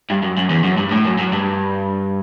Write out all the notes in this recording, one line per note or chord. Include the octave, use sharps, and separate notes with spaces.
G2
F#2
F#2
E2
F#2
G2
A2
F#2
F#2
G2